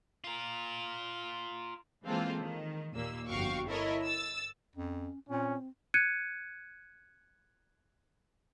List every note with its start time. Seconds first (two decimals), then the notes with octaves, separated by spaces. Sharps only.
0.24 F4 A#4
2.05 E3 G#3 A#3 C4 F4 A4
2.42 D#3
2.95 D#2 A#2 A#3 E6
3.29 G1 F2 F#4 F5 G5 C#6
3.68 E4 A4 A#4 C#5 D#5
4.05 E6 A6
4.76 F2 C#4
5.29 A#2 C4 C#4
5.94 F#6 G#6 C#7 D#7